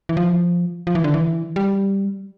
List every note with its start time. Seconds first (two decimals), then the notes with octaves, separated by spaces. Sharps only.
0.09 E3
0.17 F3
0.87 F3
0.95 E3
1.04 D3
1.14 E3
1.56 G3